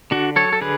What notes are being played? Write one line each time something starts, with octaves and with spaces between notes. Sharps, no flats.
D3 D4 F#4
F#3 A4 C#5
A4
D3 G#4 B4